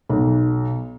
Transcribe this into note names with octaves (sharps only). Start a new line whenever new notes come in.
B1